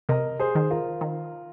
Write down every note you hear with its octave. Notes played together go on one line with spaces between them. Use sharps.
C3 A#4 D#5
G#4 C5
D#3
F4 A#4
D#3